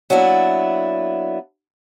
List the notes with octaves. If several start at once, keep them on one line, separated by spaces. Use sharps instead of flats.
F#3 A#3 B3 D4 E4